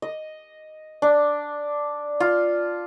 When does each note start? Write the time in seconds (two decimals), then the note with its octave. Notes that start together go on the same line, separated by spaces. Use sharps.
0.02 D#5
1.02 D4
2.20 F4